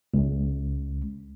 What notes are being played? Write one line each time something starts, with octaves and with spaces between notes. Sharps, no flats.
C#2